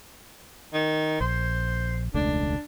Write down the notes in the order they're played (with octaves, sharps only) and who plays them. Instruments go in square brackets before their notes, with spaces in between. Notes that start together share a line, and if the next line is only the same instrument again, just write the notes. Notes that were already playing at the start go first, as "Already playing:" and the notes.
[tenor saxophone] D#3
[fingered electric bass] A#1 [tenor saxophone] C5
[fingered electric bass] E1 C#2 A3 [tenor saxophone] D4